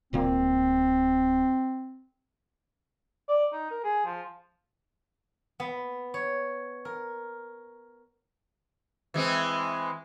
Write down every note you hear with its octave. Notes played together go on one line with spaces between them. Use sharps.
D1 A#2 A#3 C4
D5
D#4
A#4
G#4
F3
B3
C#5
A#4
E3 G#3 C4